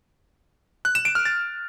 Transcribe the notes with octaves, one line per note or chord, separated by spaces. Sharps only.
F#6
E7
D7
F6
A6